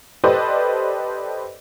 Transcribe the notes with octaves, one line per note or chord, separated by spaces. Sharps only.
G4 A4 B4 C5 D5 D#5